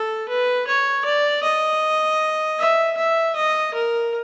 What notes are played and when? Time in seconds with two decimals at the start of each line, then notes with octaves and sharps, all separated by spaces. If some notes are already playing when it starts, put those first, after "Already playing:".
Already playing: A4
0.29 B4
0.67 C#5
1.05 D5
1.43 D#5
2.59 E5
2.97 E5
3.36 D#5
3.74 A#4